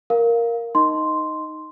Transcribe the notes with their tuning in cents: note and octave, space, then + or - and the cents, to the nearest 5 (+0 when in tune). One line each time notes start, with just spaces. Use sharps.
A#4 +0 F5 +0
D#4 +0 D#5 +0 C6 -5